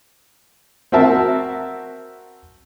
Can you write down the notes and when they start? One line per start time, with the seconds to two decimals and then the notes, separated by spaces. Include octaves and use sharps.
0.92 C4 F#4 A#4 E5 A5